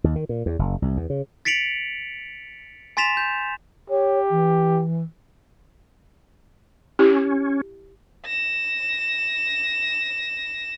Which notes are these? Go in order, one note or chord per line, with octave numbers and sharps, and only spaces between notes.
D#2
D#3
A#2
E2
F#1
C2
E2
C#3
A6 B6 C#7 D7 F7 F#7
G#5 C6 A6 B6 E7 F7
G6
G4 C#5
E3
C#4 E4 G4
A#6 E7